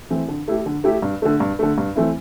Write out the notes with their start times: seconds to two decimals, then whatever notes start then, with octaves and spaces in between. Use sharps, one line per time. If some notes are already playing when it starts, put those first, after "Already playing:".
0.10 E3 A3 C4
0.28 D3
0.48 A3 E4 G4
0.66 D3
0.84 A3 E4 G4
1.02 G2
1.22 D3 A3
1.40 G2
1.59 D3 A3
1.78 G2
1.96 E3 A3 C4 E4